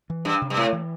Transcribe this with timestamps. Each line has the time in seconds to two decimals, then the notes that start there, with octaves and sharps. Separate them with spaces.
0.10 E3
0.25 G2 D4
0.41 C3
0.50 G2
0.57 A2 A3
0.72 E3